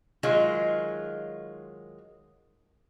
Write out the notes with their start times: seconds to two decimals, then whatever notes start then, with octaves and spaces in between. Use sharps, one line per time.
0.23 D#3 F#3 G#3 F4